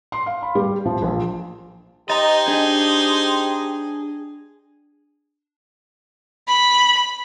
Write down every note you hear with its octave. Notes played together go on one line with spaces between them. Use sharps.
C6
F5
B5
G3
F3
A#1
D#4 G4 C5 D#5 A#5 A6
D4 G#4
B5